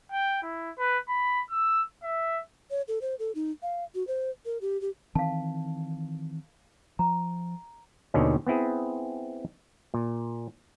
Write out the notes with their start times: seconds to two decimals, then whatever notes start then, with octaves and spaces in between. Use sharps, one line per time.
0.12 G5
0.43 E4
0.78 B4
1.09 B5
1.51 E6
2.03 E5
2.70 C#5
2.88 A4
3.02 C5
3.19 A4
3.35 D#4
3.63 F5
3.95 F#4
4.07 C5
4.45 A#4
4.61 G4
4.81 G4
5.15 D#3 E3 C4 F5 A5
6.99 F3 A#5
8.14 D#2 B2 D3 D#3 C4 C#4
8.47 B3 C4 E4 G#4
9.94 A#2